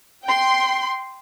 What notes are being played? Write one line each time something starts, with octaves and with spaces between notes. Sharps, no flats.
G5 C6